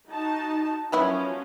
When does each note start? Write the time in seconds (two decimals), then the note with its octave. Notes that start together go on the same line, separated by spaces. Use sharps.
0.11 D#4 F#4 A5
0.92 F3 F#3 A#3 B3 C#4 E4